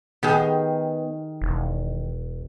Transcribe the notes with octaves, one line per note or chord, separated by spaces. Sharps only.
D#3 B3 G4 G#4
E1